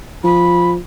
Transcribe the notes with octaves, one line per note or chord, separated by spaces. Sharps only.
F3 B5